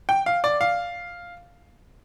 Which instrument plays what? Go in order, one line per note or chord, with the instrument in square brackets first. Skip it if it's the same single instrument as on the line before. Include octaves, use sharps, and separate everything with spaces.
[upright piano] G5
F5
D5
F5